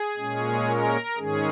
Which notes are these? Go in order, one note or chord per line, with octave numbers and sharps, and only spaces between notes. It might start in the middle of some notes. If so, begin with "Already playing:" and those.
Already playing: G#4
A#2 G#3 C#4
A#4
G#2 D#3 G#3 C#4 G#4